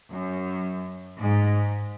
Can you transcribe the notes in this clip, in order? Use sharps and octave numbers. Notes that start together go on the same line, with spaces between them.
F#2
G#2